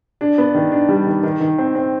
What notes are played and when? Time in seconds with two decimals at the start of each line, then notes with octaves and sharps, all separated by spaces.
0.21 D4
0.38 B3
0.54 D#3
0.72 D4
0.89 G3
1.07 D#3
1.23 D#3
1.40 D#3
1.59 C4
1.75 C4